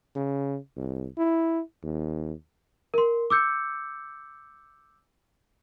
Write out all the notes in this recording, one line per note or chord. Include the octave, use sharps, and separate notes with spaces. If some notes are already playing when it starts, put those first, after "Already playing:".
C#3
C2
E4
D#2
A#4 C6
D6 E6 G6 C#7